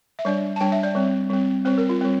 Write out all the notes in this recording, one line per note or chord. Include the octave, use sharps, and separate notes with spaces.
E5
G3 D4 D5
A5
G3 D4 G5
E5
D5
G3 C4
G3 C4
G3 C4 C5
A#4
F4
G3 C4